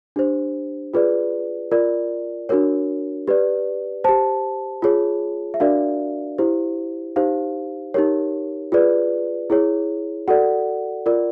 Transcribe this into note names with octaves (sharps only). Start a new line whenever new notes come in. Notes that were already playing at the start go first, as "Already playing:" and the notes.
D4 G4 C5
F4 G#4 B4 D5
F4 A#4 D5
D4 F#4 A#4 C#5
G4 B4 D5
G4 C5 A5
F4 G#4 C#5
E5
D4 F#4 A#4 D5 F5
E4 G4 C5
D#4 G4 C5 F5
D#4 G4 A#4 C#5
F4 G#4 B4 D5
E4 G#4 C#5
F#4 A4 D5 F#5
F4 A#4 D5